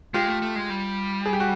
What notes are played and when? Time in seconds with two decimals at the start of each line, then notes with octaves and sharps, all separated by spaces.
0.14 G#3 F4 G4
0.28 A3
0.42 A3
0.56 G#3
0.70 G3
1.26 G#4
1.33 G4
1.40 F#4